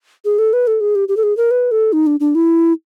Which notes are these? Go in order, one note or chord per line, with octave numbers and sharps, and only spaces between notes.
G#4
A4
B4
A4
G#4
G4
G4
A4
G#4
A#4
B4
A4
D#4
D4
D4
E4